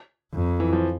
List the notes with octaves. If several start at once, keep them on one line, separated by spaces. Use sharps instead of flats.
F2
E3
F3